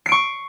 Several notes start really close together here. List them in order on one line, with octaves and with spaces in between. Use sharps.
C7 D7 C#6